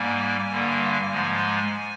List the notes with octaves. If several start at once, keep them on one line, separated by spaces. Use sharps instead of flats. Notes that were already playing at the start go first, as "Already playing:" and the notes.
Already playing: G#2 G3 A#3 G#5
G2 D3 G3 A#3
G#2 F3 G#3